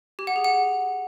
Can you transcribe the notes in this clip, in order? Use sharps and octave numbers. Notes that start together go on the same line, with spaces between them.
G4
F#5
G#4
F#5